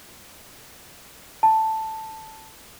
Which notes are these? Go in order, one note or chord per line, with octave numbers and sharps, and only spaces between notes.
A5